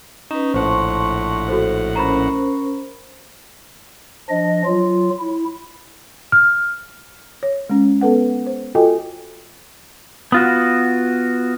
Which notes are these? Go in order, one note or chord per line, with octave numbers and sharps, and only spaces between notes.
C#4 D#4 B4
A#1 A2 C5 F#5 A5 C6 C#6
F#4 A4 C5
C#4 A#4 C5 A#5 B5
F3 D4 D#5
F#3 F4
E4
F6
C#5
G#3 C#4
B3 A4 B4 F#5
C5
F4 F#4 A4 D#5 G5 G#5
B3 F4 F#4